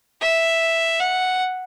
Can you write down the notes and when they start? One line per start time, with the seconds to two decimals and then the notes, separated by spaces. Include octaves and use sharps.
0.21 E5
1.00 F#5